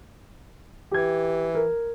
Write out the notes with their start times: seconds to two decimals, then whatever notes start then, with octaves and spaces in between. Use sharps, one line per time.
0.91 E3 G4 G#6
1.55 A#4